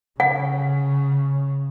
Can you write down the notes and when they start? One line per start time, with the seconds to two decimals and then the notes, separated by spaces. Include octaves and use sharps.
0.20 C#3 F#5